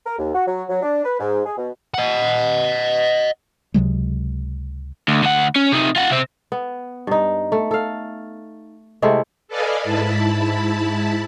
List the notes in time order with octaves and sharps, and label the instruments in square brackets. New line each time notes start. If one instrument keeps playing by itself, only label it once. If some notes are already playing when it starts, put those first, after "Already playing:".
[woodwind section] A#4
D#2
F#4
F#3
F#3
D4
B4
G#2
G#4
B2
[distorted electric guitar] D#5 F#5
[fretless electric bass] C#2 C3 F#3 G#3
[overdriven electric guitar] D2
D2 F#5
C#4
C3 D#4
F4 F#5
C3 C4
[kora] B3
G2 D#4
A3
A4 F5
C3 G#3 A3 E4
[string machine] A4 B4 D5 D#5 F5 G#5
G#2 E4 A5 B5